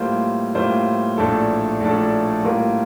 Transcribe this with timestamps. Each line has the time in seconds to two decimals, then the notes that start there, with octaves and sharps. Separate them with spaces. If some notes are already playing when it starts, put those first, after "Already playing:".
Already playing: A2 G3 A#3 F4 C5
0.55 A2 G3 A#3 F4 C5
1.17 A#1 A2 A3 D4 A4
1.80 A#1 A2 A3 D4 A4
2.43 A2 G3 A#3 F4 A#4